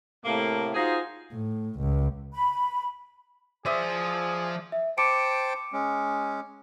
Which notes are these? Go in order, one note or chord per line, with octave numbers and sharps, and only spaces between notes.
A2 C3 A3 A#3
D#4 F4 F#4 G#4 C5
A2
C#2
B5
F3 G#4 C5 D5 E5 D#6
E5
C5 G5 A5 D6 C#7 D7
G#3 C#4